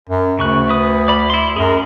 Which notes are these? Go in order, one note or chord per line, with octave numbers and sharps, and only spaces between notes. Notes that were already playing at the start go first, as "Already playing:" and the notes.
F#2
D2 C#3 C#6 F#6
B4 D#6
D5 B5
E4 C6
F#2 G#4 A#4